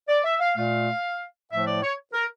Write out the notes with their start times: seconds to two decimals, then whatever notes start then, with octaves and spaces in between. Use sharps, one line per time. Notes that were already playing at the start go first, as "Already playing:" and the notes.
0.08 D5
0.24 E5
0.40 F5
0.56 A#2 A3 F5
1.51 A2 F3 A3 E5
1.67 D5
1.82 C#5
2.13 A#4